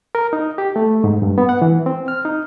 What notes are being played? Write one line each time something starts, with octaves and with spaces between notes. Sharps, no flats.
A#4
D#4
G4
A3
G#2
G2
B3
F#5
E3
C4
F6
D#4